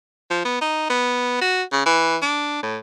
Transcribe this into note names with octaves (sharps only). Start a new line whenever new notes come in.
F3
B3
D#4
B3
F#4
C#3
E3
D4
A2